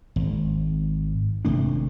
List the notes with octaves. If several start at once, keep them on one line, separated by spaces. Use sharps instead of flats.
G#1
G#1 C3 A3 D4